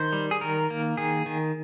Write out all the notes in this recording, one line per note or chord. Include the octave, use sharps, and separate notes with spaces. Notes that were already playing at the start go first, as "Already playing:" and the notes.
Already playing: D#3 C5
G3
G#4
D#3 A#4
A#3
D#3 G#4
D#3